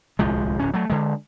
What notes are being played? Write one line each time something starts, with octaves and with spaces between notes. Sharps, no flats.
D1 C2 F3 G#3
D1 C#4
F#3 A3
D3 G#3